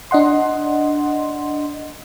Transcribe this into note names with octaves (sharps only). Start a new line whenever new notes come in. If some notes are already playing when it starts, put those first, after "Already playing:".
D4 D#5 F#5 C6